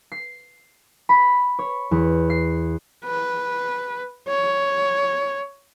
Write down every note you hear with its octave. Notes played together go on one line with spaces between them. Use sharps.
C7
B5
C#5
E2
C7
B4
C#5